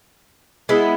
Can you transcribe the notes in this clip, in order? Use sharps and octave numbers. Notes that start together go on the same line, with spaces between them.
G#3 B3 E4